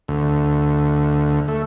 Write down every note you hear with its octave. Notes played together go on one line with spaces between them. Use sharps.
D2
A3